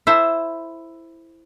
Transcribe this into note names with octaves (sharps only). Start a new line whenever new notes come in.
E4 A4 C5 E5